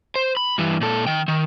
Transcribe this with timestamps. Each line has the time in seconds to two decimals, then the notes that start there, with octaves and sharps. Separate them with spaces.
0.16 C5
0.37 B5
0.58 G2 E3
0.81 A#2 A4
1.07 D#3 G5
1.28 D#3